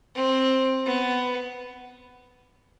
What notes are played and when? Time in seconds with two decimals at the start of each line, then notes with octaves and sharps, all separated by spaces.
0.15 C4
0.85 B3